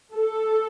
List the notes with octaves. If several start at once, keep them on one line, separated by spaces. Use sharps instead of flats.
A4